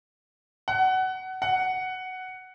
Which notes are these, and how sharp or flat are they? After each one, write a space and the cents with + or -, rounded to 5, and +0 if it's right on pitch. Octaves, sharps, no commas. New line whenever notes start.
F#5 +20
F#5 +5